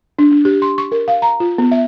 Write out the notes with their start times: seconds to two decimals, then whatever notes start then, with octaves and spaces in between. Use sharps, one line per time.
0.19 D4
0.31 D4
0.45 G4
0.62 C6
0.78 C#6
0.92 A#4
1.08 F5
1.22 A#5
1.40 F4
1.58 B3
1.72 E5